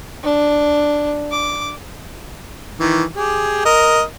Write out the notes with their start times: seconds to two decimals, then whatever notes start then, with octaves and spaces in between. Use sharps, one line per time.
0.23 D4
1.31 D6
2.80 D#3 E3
3.17 G4 G#4
3.65 A#4 D#5